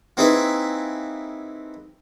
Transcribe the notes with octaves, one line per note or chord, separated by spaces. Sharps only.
A#3 C4 D#4 E4 G#4 B4